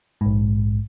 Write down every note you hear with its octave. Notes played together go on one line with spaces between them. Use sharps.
A#1 G#2